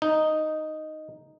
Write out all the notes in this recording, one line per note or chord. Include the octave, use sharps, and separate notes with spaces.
D#4